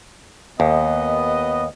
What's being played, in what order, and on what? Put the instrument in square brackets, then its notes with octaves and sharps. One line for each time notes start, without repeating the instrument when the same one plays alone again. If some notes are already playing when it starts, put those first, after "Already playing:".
[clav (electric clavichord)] D#2 [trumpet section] B3 D#5